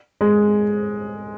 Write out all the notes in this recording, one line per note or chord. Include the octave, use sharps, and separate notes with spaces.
G#3